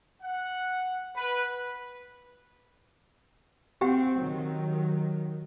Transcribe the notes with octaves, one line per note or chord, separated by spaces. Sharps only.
F#5
B4
C4 G4 F#5
D#3 F#3